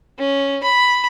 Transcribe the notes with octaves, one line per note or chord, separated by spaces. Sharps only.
C#4
B5